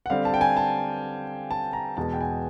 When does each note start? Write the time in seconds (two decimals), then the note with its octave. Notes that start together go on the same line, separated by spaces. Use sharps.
0.06 F#5
0.10 D3 G3 C4 F5
0.25 A5
0.34 G5
0.41 G#5
0.57 A5
1.51 A5
1.73 A#5
1.97 E2 B2 G#3 A5
2.13 G5
2.21 G#5